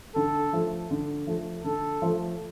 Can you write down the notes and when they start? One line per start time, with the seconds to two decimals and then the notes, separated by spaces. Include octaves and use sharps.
0.16 D3 A4
0.53 F3 A3
0.91 D3
1.27 F3 A3
1.64 D3 A4
2.02 F3 A3